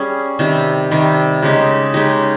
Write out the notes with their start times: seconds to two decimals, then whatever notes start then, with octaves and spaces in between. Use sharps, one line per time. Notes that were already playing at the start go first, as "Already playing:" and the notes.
Already playing: G3 C#4 G#4
0.39 C3 D#3 G3
0.91 C3 D#3 G3
1.42 C#3 G#3 D#4 G4
1.94 C#3 G#3 D#4 G4